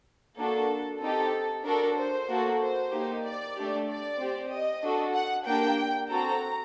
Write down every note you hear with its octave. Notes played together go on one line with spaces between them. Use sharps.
A#3 D4 F#4 A4
C4 D#4 G4 A4
D4 F#4 A4 A#4
C5
A#3 F#4 A4
C5
A#3 D#4 G4
D5
A3 D4 G4
D5
C4 G4
D#5
D4 F#4 A4
F#5
A#3 D4 G4 G5
C4 F#4 A4 A#5